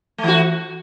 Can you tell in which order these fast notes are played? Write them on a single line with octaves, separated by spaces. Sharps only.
A3 E3 F#4